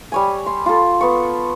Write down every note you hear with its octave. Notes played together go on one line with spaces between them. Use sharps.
G3 C#5 G#5
C6
F4 A4
B3 C#6